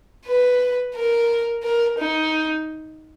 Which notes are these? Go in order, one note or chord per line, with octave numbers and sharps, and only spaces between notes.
B4
A#4
A#4
D#4